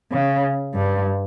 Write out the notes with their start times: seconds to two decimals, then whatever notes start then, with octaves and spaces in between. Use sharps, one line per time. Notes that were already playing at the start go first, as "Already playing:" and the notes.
0.12 C#3
0.74 G2